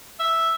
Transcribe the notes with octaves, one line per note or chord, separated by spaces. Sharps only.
E5